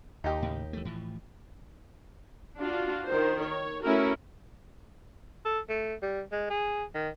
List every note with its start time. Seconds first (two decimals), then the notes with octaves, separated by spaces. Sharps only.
0.24 D#2 D#4 G4
0.42 A2 C#3
0.73 E3 A3
0.85 A2 E3 F3
2.56 D4 F4 F#4
3.06 D#3 A#4 C5
3.41 C#5
3.83 A3 C#4 E4 F#4 A#4
5.45 A4
5.69 A3
6.02 G3
6.32 G#3
6.50 G#4
6.95 D#3